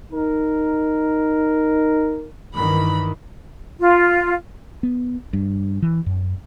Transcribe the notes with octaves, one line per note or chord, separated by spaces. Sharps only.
D#4 A#4
G2 D#3 E3 B5
F4
B3
G2
E3
F#2